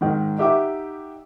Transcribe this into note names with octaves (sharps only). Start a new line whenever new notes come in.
G#2 D#3
D#4 G4 E5 F#5 D6